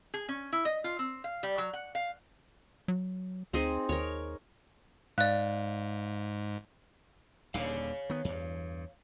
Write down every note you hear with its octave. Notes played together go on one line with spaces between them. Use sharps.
G#4
C#4
E4
D#5
F4
C4
F5
G3
F#3
F#5
F5
F#3
D2 C4 D#4 G#4
D#2 A#4 C#5
G#2 D5 F5 F#6
D#1 D#2 D3 C#5 F5
D#3 B3
E2 G2